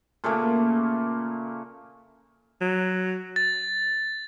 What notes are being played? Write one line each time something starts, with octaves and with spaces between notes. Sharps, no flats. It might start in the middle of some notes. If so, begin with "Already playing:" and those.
A#2 C#3 A3 A#3
F#3
A6